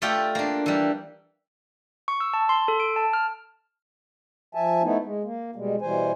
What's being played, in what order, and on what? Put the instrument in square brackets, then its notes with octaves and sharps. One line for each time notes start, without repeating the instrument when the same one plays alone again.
[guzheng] A3 F4 G4 A4 D5 G5
A#3 D4
E3 G3
[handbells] C#6
E6
A5
C6
A4
D7
A5
F6
[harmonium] F3 E5 G#5 A5
A3 B3 D#4 E4
G#3
A#3
B2 G3 G#3
B2 E3 G3 C5 G#5